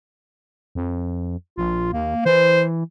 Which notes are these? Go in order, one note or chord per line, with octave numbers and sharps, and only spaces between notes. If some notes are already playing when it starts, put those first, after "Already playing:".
F2
A#1 F4
D#2 A#3
E3 C5